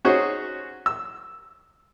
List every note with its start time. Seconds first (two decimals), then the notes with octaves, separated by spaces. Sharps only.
0.05 C#4 D#4 F#4 G#4 C5 C#5
0.86 E6